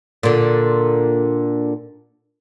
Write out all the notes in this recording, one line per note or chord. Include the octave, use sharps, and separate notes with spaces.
A#2 D3